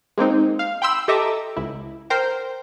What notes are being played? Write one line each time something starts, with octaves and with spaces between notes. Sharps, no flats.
G#3 A#3 C4 D#4
F5
G5 B5 C6 E6
G4 A4 D#5 E5 A#5 D6
C#2 E4
A#4 C5 G5